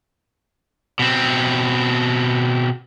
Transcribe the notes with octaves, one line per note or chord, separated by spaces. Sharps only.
B2 C4